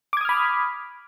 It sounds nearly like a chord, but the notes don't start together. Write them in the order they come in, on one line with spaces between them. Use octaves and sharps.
D6 G#6 D#6 F6 B5